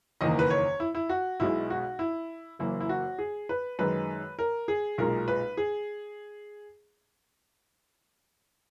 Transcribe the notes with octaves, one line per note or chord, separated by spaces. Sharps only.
F#1 E2 D#3 A#3 D#5
B4
C#5
E4
E4
F#4
B1 B2 G#3 E4
F#4
E4
F#1 F#2 E3 A#3 E4
E4
F#4
G#4
B4
F#2 D#3 G#3 B4
A#4
G#4
B1 A#2 G#3 A#4
B4
G#4